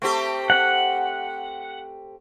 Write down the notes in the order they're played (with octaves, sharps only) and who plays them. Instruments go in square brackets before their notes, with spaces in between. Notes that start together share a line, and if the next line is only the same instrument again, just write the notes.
[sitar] A3 C4 G4
[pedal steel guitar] F#5